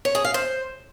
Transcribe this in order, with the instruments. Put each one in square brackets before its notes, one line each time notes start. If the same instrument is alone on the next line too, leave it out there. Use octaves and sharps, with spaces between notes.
[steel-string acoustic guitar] C#5
G#4
F5
C5